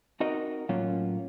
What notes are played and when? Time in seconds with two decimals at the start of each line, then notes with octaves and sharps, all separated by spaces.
0.20 C4 D#4 F#4 A#4 D#5
0.69 A2 F#3 A#3 C#4 F4